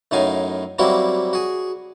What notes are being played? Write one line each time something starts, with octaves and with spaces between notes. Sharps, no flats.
F#2 A2 F#3 D#4 F5 G#5
F#3 G3 A#3 C4 E4 F#4
F#4 G#4